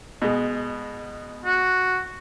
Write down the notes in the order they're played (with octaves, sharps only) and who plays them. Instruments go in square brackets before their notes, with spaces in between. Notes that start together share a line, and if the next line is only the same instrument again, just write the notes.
[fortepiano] B2 G#3
[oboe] F#4